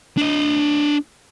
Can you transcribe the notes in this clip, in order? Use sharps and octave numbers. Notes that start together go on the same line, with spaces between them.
D4 D#5